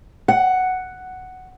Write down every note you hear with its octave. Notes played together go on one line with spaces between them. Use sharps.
F#5